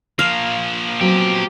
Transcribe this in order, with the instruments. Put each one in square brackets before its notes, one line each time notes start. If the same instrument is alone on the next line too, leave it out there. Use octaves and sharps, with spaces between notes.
[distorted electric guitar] F3 A#3 [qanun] F5
[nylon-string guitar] F#3 B3 C4 [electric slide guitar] G4